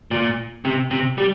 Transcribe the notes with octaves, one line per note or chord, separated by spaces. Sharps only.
A#2
C3
C3
G3